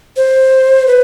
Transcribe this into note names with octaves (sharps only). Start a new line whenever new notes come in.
C5
B4